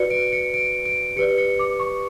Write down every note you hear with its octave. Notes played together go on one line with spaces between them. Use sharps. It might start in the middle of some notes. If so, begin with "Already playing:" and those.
Already playing: F#4 B4 D5 C#7
D7
C#7
D7
D7
G4 B4 D5 C#7
C#7
D6
C#6